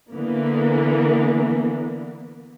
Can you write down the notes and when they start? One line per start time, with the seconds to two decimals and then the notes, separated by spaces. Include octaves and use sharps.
0.13 D3 E3 A#3 B3